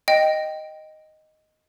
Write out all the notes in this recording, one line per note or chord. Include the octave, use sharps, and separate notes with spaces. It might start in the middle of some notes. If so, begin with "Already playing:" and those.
D#5 G5